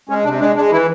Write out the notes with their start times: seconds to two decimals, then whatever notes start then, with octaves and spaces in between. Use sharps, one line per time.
0.09 G#3 C#4
0.24 C3 D4
0.40 G#3 D4
0.56 G#3 D4
0.72 E3 E4